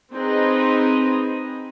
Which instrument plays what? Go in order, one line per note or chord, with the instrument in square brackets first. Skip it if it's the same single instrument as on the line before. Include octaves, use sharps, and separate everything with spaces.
[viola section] C4 D#4 G#4 B4 D#5